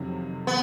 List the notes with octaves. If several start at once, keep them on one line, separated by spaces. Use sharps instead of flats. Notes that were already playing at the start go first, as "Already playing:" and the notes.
Already playing: F2 C3 D#3 F#3
B3